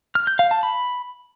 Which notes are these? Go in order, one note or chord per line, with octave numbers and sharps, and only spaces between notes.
F6
G6
F5
A5
B5